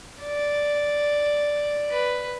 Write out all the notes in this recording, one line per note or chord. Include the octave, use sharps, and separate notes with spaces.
D5
B4